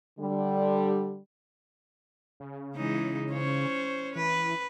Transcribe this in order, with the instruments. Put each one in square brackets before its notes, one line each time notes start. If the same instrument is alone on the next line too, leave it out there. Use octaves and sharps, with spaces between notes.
[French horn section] D3 G3
[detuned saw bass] C#3
[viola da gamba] E3 G#3 D#4
C#4 C5 C#5
[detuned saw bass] E3 [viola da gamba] B4